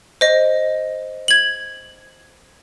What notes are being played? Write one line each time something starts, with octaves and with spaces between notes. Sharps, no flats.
C5 D#5
G#6 F#7